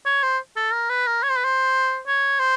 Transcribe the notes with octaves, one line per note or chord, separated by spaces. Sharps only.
C#5
C5
A4
A#4
B4
A#4
C#5
C5
B4
C5
C#5
C5